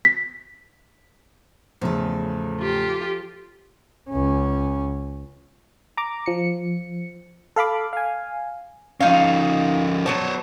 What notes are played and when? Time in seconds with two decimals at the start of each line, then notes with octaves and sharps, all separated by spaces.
0.05 B6
1.82 E2 A2 C#3 F3 A4
2.60 F4 G4
4.10 C#2 C#4
5.97 A#5 D6
6.26 F3 C#7
7.56 A4 F5 B5 D6
7.93 F5 G#5
9.01 F3 C#4 D#4 F5
10.06 F#3 B3 C5 C#5 A5